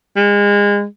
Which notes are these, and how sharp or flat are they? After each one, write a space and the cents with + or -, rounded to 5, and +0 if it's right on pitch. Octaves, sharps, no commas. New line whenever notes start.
G#3 -30